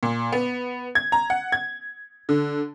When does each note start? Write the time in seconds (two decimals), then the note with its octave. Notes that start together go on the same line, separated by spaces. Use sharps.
0.03 A#2
0.32 B3
0.95 G#6
1.12 A#5
1.30 F#5
1.52 G#6
2.29 D3